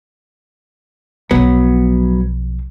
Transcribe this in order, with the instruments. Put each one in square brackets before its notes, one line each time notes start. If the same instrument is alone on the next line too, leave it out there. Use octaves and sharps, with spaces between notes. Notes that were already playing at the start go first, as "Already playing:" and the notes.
[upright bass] B1 F3 [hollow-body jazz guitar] F#3 B3